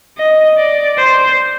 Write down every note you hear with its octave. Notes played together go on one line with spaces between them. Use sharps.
D#5
D5
C5